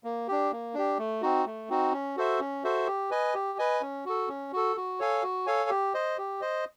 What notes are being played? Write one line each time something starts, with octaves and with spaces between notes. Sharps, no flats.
A#3
D4 G4
A#3
D4 G4
A3
C4 D#4 F#4
A3
C4 D#4 F#4
C#4
F#4 A4 C5 E5
C#4
F#4 A4 C5 E5
G4
B4 D#5 G#5
G4
B4 D#5 G#5
C#4
F#4 A4
C#4
F#4 A4
F#4
A4 C#5 F5 G#5
F#4
A4 C#5 F5 G#5
G4
C5 D#5
G4
C5 D#5